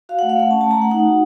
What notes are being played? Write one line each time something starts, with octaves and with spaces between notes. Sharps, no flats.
F#4 F5
A3 F#5
F5
A3 F#5
C#4 A5
A3 A5
A#5
A3 F#5
D#4 F#5
F#4